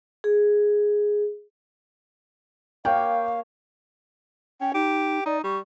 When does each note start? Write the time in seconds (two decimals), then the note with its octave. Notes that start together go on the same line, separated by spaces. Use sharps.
0.24 G#4
2.85 A#3 C#5 F5 G5
4.61 C#4 G5
4.74 D#4 G4
5.26 D#4 D5
5.44 G3 C#6